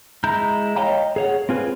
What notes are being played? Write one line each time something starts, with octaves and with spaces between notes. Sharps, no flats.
G#3 E4 A#5 G6
C#5 D#5 F5 G5 A#5
G#4 C#5 F#5
C4 F4 G#4 B4